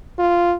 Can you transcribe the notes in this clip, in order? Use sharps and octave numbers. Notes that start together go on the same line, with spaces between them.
F4